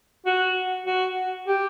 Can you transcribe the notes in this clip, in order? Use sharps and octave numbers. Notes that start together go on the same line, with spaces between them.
F#4
F#4
G4